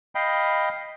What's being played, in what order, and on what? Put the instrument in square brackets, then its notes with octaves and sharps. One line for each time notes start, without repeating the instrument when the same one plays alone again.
[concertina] D#5 F5 G5 B5